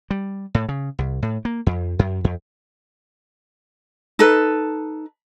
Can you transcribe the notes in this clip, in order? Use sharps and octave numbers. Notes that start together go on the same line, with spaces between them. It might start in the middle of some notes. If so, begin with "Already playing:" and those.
G3
A2
C#3
C2
A2
A#3
F2
F#2
F2
D#4 A4 B4